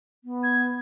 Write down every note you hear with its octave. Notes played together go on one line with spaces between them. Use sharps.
B3
G#6